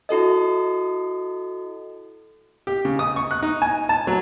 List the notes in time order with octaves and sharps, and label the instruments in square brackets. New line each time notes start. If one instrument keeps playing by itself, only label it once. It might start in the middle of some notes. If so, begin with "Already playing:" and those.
[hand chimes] E4 F#4 A4 D#5
[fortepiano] G4
C#3
D#6
C#6
F#6
D#4
G#5
A5
F#3